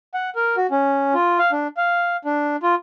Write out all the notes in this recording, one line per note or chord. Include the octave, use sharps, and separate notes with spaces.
F#5
A#4
F#4
C#4
F4
F5
D4
F5
D4
F4